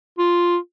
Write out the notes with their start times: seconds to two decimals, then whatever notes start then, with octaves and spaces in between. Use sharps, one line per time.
0.18 F4